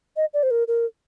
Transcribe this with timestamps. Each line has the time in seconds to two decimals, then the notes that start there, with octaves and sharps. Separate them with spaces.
0.17 D#5
0.34 D5
0.43 C5
0.51 A#4
0.68 A#4